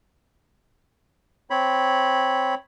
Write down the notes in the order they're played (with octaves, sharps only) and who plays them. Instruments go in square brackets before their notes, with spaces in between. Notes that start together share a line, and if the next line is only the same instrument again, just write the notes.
[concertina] C4 C#5 B5